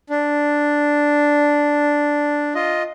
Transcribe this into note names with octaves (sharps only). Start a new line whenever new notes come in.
D4
F4 D#5